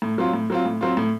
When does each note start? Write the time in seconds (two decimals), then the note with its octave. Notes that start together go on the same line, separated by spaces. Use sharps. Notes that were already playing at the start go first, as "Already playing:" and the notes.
0.02 A2
0.18 F#3 C4 F4
0.33 A2
0.50 F#3 C4 F4
0.65 A2
0.81 F#3 C4 F4
0.97 A2